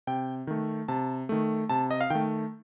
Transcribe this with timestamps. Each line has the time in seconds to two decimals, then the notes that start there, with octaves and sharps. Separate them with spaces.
0.07 C3 G5
0.47 D#3 A3
0.88 C3 A5
1.29 D#3 A3
1.69 C3 A5
1.91 D#5
2.01 F5
2.10 D#3 A3 G5